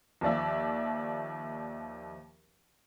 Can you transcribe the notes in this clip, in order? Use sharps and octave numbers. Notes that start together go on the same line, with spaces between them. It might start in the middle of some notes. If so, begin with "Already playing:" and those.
D#2 F3 D5 E5